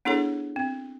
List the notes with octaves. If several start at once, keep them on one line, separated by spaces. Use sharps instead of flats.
B3 D4 E4 G#4 A4 C#5
C4